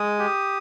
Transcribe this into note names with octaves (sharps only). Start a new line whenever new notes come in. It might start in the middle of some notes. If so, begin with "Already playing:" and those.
Already playing: G#3 D#6
G4